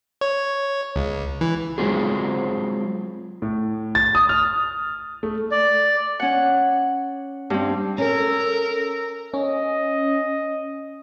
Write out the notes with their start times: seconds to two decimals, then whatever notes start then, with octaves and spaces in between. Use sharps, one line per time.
0.21 C#5
0.96 C#2
1.41 E3
1.78 F#3 G#3 C4 F4 G#4
3.42 A2
3.95 A6
4.15 D#6
4.29 F6
5.23 A3
5.51 D5
6.20 C#4 F#5
7.50 G2 C4
7.98 C#4 A4 A#4
9.34 C#4 D#5